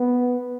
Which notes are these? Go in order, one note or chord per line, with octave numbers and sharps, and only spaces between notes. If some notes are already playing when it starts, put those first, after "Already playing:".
Already playing: B3